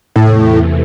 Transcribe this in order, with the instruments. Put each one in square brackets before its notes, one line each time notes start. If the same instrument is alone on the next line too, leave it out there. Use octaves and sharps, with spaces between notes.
[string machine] E2 C3 E3 A3 [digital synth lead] A2